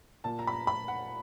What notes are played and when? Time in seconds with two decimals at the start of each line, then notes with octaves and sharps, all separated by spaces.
0.24 A#2 A5
0.39 A#5
0.47 B5
0.53 A#5
0.67 B5
0.88 F#5